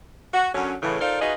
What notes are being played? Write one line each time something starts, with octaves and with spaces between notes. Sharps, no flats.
F#4
F#2 D3 F#3 C#4
A2 C#3 E3
D#4 F4 A4 A#4 C5 D5
D#4 F4 F#4 G#4 B4 D#5